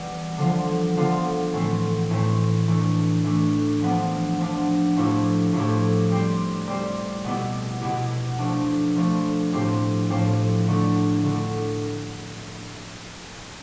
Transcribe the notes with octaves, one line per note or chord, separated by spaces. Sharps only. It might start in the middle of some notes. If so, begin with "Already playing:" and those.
Already playing: E3 G3 B3
D3 F3 B3 F4
D3 F3 B3 F4
A2 E3 A3 C4
A2 E3 A3 C4
E3 A3 D4
E3 A3 D4
F3 B3 D4
F3 B3 D4
A2 F3 A3 E4 G4
A2 F3 A3 E4 G4
G3 C4 G4
G3 C4 G4
B2 B3 E4 G4
B2 B3 E4 G4
F3 A3 D4
F3 A3 D4
A2 F3 C4 G4
A2 F3 C4 G4
D3 A3 D4
D3 A3 D4